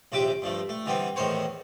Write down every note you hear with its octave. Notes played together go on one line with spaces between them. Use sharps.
A#1 D#2 C3 G4 E5 D6
G2 F3 A3
A3
D3 E3 G3 B3 C4
E2 A2 D#3 A#4 C5 C#5